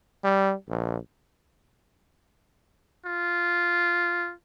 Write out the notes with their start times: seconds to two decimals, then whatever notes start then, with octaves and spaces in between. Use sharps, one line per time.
0.24 G3
0.69 A#1
3.06 F4